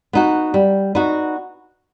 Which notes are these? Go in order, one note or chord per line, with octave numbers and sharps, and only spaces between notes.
B3 D#4 F#4
G3
B3 D#4 F#4